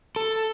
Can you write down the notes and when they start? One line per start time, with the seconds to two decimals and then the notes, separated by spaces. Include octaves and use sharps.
0.16 A4